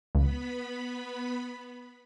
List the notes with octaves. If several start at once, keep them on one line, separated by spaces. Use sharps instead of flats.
C#2 B3 B5